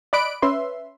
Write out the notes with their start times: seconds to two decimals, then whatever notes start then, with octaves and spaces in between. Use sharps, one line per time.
0.13 D5 D#5 B5 F#6 D7
0.42 C#4 B4 E5 C6